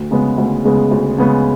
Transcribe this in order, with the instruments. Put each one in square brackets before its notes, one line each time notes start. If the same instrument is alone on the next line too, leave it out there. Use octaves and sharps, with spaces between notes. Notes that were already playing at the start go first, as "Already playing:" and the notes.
Already playing: [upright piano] D2
C#3 G#3 B3
D2
C#3 G#3 B3
D2
C#3 G#3 B3